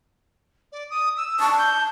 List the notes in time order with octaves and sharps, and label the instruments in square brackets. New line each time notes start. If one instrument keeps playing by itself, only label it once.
[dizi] D5
D#6
E6
[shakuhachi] A5 [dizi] C#6
[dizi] G6